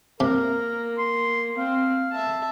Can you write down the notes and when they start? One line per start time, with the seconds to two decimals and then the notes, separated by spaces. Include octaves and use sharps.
0.20 C3 A#3 A#4
0.98 C6
1.57 C4 F5
2.12 E5 A5